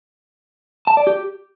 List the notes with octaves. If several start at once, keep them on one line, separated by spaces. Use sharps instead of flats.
A5
D5
G4